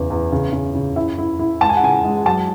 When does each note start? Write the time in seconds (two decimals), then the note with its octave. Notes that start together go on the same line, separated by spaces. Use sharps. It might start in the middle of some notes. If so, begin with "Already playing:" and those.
Already playing: E2 C#3
0.10 E2
0.32 C#3
0.53 C#3
0.75 C#3
0.96 E4 E5
1.18 E4
1.39 E4
1.61 G#3 A5
1.69 G#5
1.76 F#5
1.83 C#3 G#5
2.04 G#3
2.25 F#3 A5